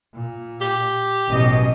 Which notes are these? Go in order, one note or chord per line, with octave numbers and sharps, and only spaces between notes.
A#2
G4
A1 B2 F#3 D#5